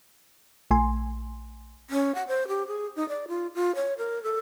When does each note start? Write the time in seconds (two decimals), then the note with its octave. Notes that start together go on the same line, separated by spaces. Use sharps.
0.71 A#1 A3 G#5 C6
1.90 C#4
2.15 F#5
2.28 C5
2.48 G4
2.68 G#4
2.96 D#4
3.09 D5
3.28 F4
3.55 F4
3.75 C#5
3.98 A#4
4.23 A4